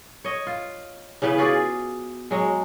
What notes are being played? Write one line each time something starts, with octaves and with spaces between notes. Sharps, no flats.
C#5 D#5
F4
C#3 E3 B3 B4
F4 F#4 G#4 D5
F#3 G#3